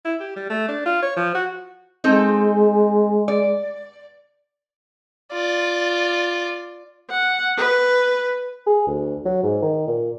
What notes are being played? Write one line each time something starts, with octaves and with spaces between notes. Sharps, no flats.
E4
G4
G3
A3
D4
F4
C#5
F3
F#4
G#3 C4 D#4 A4
D5
F4 D5
F#5
B4
G#4
D2
F#3
G#2
D#3
A#2